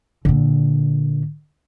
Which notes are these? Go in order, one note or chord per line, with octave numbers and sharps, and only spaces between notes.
A#2 D3